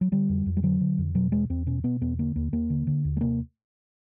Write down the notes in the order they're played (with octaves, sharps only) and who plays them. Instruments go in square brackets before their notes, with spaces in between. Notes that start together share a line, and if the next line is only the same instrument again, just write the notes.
[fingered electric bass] F#3
D3 G3
F2
F2
G3
D3 F#3
D3
F2
B2 F#3
E2 G#3
E2 C4
B2 C#4
B2 B3
E2 B3
D3 A#3
D#2 A#3
D#2 A#3
D3
D3
D#2
A3
C3 A#3